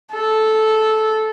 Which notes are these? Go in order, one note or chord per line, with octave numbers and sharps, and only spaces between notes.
A4